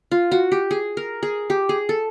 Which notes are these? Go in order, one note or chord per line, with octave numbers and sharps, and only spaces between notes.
F4
F#4
G4
G#4
A#4
G#4
G4
G#4
A4